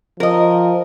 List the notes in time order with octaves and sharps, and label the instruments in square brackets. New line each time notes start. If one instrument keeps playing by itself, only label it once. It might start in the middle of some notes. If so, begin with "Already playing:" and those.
[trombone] F3 [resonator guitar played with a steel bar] A#4 D#5